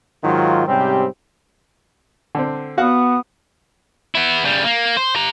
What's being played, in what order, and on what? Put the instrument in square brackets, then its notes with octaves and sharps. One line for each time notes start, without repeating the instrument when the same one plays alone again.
[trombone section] G#2 D#3 F#3 F4
G#2 C3 G3 C4 C#4 G4
[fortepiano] D3 C4
[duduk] B3 [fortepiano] F#4 F5 F#5
[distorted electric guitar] B3 E4
C#3 G3
A#3
C5
G4 A#5